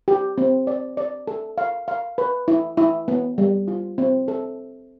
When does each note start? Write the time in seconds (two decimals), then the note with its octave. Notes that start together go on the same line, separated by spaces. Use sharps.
0.08 G4
0.38 C4
0.67 D5
0.97 D5
1.27 A4
1.58 F5
1.88 F5
2.18 B4
2.48 E4
2.77 E4
3.08 B3
3.38 G3
3.68 F4
3.98 C4
4.28 A4